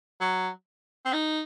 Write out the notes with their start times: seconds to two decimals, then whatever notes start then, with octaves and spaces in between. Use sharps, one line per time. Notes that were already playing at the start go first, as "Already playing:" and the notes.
0.21 F#3
1.06 C4
1.13 D#4